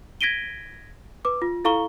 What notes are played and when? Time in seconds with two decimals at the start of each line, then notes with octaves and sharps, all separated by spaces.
0.21 G#6 A#6 B6 D7 D#7 G7
1.25 B4 D6
1.42 F4
1.65 E4 A4 F5 A#5 C#6 G7